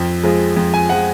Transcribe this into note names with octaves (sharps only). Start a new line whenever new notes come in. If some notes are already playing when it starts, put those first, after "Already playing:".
Already playing: F2
F3 G#3
F2
G#5
F3 G#3 F#5